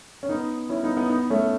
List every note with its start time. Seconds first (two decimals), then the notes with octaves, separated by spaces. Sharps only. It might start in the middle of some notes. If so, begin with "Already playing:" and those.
0.23 C#4
0.29 B3 D#4
0.69 C#4 E4
0.83 B3 D#4
0.96 B3 D#4
1.10 B3 D#4
1.30 A3 C#4